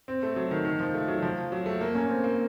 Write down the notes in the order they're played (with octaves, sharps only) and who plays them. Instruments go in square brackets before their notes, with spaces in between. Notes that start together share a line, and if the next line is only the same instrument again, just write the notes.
[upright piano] C4
A3
F#3
D#3
D#3
F3
A3
F#3
F3
F#3
A3
A#3
C#4
C4
A#3